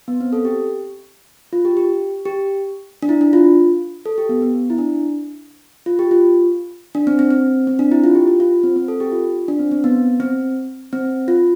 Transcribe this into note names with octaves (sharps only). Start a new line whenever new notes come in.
B3
C4
A4
G4
F4
G4
G4
G4
D4
E4
D4
F4
A4
G4
B3
B3
E4
D4
F4
G4
F4
D4
C4
C4
C4
C4
D4
E4
F4
G4
F4
F4
C4
C4
A4
G4
F4
D4
C4
C4
B3
C4
C4
F4